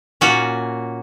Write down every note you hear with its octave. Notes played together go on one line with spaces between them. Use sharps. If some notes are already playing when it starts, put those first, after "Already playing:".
A#2 A#3 C#4 F#4